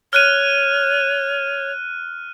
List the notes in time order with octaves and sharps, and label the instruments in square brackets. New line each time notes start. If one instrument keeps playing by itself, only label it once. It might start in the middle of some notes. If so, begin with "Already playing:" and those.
[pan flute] C#5 [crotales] F6 F#6 D#7